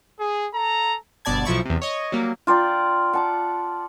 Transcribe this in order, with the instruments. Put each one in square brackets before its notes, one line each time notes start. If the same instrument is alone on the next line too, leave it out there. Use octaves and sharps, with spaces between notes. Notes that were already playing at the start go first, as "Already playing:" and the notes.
[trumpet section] G#4
A4 A#5
[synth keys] G1 B2 D5 A5 G#6
B1 F3 E4 C#6
E2 C3
C#5 D#5
F#3 G3 A#3
[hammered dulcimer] F4 D5 G5 A#5
F#5 A5 D6